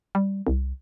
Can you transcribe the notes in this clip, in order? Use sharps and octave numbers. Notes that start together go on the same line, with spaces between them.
G3
C2